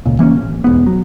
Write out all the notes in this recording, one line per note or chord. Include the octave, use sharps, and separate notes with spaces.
C#2 A#2
E3 A#3 B3 C#4
A1
E1 A1 G#2 B3
F#3